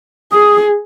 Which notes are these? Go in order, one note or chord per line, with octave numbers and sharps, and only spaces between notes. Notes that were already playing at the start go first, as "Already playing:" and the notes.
G#4 D#6